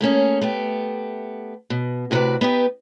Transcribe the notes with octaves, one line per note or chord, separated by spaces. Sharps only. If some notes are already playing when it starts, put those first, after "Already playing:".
A3 A#3 C#4 G#4
A3 B3 G4
B2
A2 C3 F#4 G#4 B4 D5
B3 D#4 G4 B4